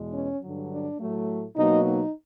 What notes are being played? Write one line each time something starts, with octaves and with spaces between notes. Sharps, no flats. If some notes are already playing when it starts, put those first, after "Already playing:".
Already playing: E2 B2 G#3
C#4
G2 D3 F#3
D4
A2 F#3 A3
B2 F#3 A#3 D#4
D#4